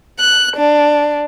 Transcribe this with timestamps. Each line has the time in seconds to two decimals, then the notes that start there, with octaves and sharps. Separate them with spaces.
0.19 F#6
0.56 D4